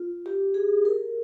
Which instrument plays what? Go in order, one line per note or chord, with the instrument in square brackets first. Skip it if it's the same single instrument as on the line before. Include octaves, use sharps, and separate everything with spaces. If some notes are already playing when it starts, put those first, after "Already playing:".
Already playing: [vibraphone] F4
G4
G#4
A#4